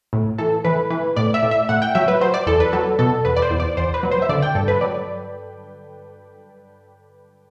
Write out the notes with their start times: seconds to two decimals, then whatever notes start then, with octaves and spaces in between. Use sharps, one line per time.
0.13 A2
0.38 E3 A4
0.65 E3 B4
0.90 E3 B4
1.16 A2 D5
1.34 E5
1.43 A2
1.51 E5
1.69 A2 F#5
1.82 G5
1.95 F#3 E5
2.08 B4
2.21 F#3 C5
2.34 D5
2.47 E2 A4
2.60 B4
2.73 F#3 A4
2.99 B2 A4
3.25 E2 B4
3.37 D5
3.42 C5
3.51 E2
3.60 D5
3.77 E2 C5
3.94 B4
4.03 F#3
4.11 C5
4.22 E5
4.29 D3 D5
4.42 G5
4.55 G2 A4
4.68 B4
4.81 F#3 D5